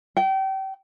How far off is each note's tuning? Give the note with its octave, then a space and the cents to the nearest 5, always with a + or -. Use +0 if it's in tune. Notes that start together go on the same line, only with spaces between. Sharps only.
G5 -30